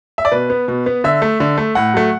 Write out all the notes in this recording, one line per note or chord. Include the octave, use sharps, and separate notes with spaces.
E5
D5
B2 B4
B3
B2
B3
D3 E5
A3
D3
A3
A2 F#5
F#3 A3